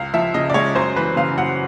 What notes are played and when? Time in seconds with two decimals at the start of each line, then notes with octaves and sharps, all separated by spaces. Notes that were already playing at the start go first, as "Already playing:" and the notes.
Already playing: C#2 F5
0.14 F3 E5
0.34 C#3 D#5
0.50 D5
0.54 G#3 C#5
0.75 F#2 C5
0.96 E3 B4
1.16 C#3 F5
1.37 F#2 F#5